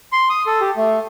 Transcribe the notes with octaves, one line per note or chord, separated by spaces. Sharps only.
C6
D#6
A4
G4
A3